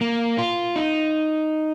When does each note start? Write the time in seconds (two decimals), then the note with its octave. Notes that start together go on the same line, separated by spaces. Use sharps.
0.01 A#3
0.38 F4
0.76 D#4